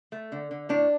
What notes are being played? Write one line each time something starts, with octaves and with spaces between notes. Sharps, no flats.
A3
D3
D3
A2 D4